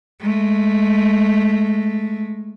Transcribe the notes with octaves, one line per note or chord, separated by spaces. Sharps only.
G#3 A3